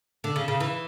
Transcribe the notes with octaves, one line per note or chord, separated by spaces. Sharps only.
D3
C#3
C#3
E3